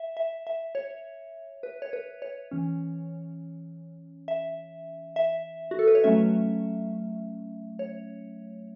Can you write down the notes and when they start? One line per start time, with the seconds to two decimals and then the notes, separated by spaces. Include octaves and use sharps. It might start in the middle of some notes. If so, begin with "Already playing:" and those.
Already playing: E5
0.17 E5
0.47 E5
0.75 C#5
1.63 B4
1.82 C#5
1.93 B4
2.22 C#5
2.51 E3 C#4
4.28 E5
5.16 E5
5.71 F#4
5.79 A4
5.87 B4
5.95 C#5
6.04 F#3 A3 C#4 E5
7.79 C#5